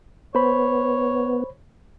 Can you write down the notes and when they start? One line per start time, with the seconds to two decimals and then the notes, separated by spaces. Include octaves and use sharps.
0.35 B3 C5 C#5 B5